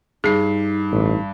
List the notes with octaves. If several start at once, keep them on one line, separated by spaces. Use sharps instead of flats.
G2 D#4 G#4 C7
A1